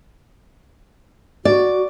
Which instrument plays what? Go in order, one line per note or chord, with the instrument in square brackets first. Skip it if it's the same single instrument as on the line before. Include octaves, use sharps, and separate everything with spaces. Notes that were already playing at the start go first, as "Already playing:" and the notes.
[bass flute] F#4 [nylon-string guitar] D5